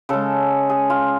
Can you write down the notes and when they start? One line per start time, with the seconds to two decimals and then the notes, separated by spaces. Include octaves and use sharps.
0.09 C#3 G#3 A4
0.70 G#4
0.90 F4